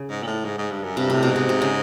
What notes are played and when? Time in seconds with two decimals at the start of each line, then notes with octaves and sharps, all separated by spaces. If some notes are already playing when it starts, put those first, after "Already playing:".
Already playing: C#3
0.10 G#2
0.23 A#2
0.27 A2
0.45 G#2
0.58 G#2
0.71 G2
0.84 F#2
0.97 G2 C3
1.10 A2 C3
1.23 B2
1.31 G#2 C3
1.49 C3
1.62 C#3